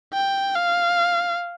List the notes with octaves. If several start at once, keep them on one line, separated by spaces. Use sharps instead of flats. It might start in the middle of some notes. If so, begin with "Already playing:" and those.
G5
F5